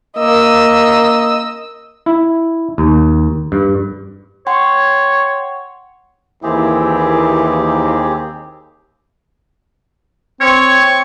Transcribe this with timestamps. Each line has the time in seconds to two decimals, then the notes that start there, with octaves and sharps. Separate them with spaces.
0.18 A#3 D#5 E6
2.06 E4
2.78 D#2
3.52 G2
4.47 C#5 F#5 G5 C6
6.43 D#2 E3 A#3 C4 E4 G4 G#4
10.41 C4 C#5 C#6